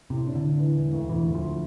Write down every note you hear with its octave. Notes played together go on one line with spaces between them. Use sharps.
A2 C3
D4
D3
D4
E3
E1
D2
E1 E3
D2
F3